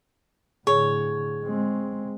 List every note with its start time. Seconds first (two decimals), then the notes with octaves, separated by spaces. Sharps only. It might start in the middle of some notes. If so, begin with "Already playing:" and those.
0.67 A2 D3 G#4 C#5 C#6
1.44 G#3 C4